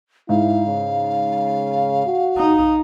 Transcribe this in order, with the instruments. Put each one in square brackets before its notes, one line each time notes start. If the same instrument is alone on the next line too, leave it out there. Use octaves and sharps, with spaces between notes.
[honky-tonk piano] G#2 [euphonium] E4 [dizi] F5
[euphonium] C#3
F#4
[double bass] D#4